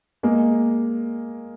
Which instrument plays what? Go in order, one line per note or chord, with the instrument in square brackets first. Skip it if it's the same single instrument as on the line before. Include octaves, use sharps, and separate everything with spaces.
[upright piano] G#3 A#3